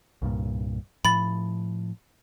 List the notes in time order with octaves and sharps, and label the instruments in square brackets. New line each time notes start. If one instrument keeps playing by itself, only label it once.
[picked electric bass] C2 G2 A#2
[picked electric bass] A2 F3 [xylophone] B5 A6